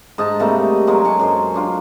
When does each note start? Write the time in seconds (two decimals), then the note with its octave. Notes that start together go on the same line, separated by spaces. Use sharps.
0.18 G#2 D#5 A5
0.40 C3 G3 A3 A#3
0.87 F#3 G#3 A#3
1.05 C#5 G#5 A5
1.19 F#2 G#3 C5
1.54 F#3 D4 F4